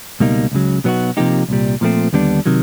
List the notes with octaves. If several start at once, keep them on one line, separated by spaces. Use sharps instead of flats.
C#2 B2 G3 A#3 D#4
C#2 C#3 F#3
B2 F#3 B3 D#4 F#4
C3 F3 A#3 D#4 G4
C2 A#2 G3
A#2 F3 A3 C4
D#2 D3 G3 B3 D4
C3 D#3 F#3